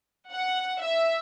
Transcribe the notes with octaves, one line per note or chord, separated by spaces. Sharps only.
F#5
E5